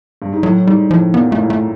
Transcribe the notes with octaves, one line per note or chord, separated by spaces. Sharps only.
G2
G#2
A2 F#3
G#2 G3
A2 F3
A#2 B3
A#2 A3
A2
A3